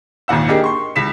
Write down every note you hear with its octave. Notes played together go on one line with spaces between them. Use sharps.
G#1 D#2 A#2 F#5 E6
A#3 D4 D#4 G4 G#4
C6 C#6
C#2 B6 E7